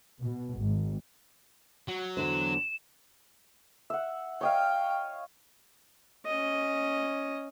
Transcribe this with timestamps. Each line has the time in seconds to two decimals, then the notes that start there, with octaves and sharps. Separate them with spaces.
0.23 B2
0.59 G#1
1.88 F#3
2.17 E2 D3 C5 E7
3.90 E5 F#5
4.41 C#5 D#5 F5 G5
6.26 C#4 D#5